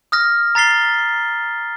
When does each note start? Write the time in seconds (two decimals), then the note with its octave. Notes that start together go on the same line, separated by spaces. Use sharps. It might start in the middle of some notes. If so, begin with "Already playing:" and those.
0.12 D#6 F6 A#6
0.55 A#5 A6 B6 C7 G7